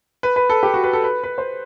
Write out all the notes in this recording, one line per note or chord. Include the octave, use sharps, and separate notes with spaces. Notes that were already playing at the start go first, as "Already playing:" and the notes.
B4
B4
A4
G4
F#4
B4
A4
B4
B4
C5